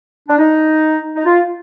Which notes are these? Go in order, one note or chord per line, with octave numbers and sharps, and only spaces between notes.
D4
D#4
D#4
F4